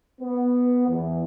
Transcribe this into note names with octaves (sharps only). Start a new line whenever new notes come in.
B3
E2